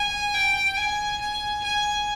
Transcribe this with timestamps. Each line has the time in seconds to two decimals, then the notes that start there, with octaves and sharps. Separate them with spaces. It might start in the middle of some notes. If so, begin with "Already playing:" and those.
Already playing: G#5
0.33 G5
0.77 G#5
1.21 G#5
1.64 G#5